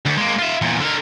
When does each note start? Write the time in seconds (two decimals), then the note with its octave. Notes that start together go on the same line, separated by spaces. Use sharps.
0.05 D2
0.17 G#3 A#3
0.38 F4 E5
0.62 E2 A#2
0.80 D3 A#4